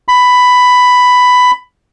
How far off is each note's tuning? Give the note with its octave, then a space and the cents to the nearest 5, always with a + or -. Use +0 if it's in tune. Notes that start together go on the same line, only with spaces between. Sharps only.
B5 +10